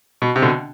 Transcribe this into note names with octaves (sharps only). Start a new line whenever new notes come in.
B2
C3
B2 D3